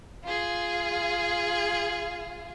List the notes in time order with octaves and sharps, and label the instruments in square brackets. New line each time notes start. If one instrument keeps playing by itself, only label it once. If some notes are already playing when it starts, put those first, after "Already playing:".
[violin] F4 G#4